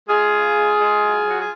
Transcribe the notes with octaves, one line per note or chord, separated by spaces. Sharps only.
G#3 F4 G#4
C#3
G#3
G#3
F#3
F#3 F#4
G#4